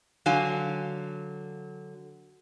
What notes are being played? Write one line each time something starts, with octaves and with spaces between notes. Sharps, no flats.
D3 F#3 F5 G#5